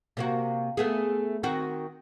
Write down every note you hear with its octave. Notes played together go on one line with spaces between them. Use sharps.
C3 A#3 F#4
A3 B3 G#4
D#3 C4 F#4